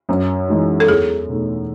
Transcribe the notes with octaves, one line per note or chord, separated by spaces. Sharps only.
F#2
E3 G#3 D#4
A4
E2 G#4
B2 A3 D#4